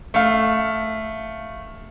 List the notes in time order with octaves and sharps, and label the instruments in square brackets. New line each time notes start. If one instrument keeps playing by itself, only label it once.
[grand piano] A3 F5